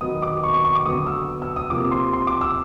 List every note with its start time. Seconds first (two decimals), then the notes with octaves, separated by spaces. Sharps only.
0.01 D#3 F#3 B3 D#6
0.22 D6
0.43 C#6
0.53 C#6
0.65 C#6
0.75 D6
0.85 D3 F#3 B3 D#6
1.07 E6
1.42 E6
1.56 D#6
1.70 C3 F3 A#3 D6
1.91 C6
2.13 C6
2.27 D6
2.41 E6